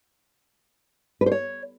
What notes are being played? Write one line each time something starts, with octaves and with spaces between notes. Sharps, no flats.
B4
C5
C#5